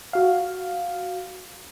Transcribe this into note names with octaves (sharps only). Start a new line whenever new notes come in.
F#4 F5